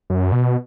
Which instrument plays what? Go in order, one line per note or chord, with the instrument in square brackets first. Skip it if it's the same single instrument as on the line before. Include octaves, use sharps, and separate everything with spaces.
[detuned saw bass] F#2
B2